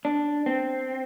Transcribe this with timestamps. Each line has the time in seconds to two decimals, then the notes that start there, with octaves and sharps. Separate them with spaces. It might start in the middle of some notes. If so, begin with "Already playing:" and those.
0.05 D4
0.46 C4